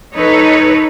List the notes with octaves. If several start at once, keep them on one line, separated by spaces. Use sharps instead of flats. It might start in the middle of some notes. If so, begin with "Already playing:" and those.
D#4 A4 B4 C#5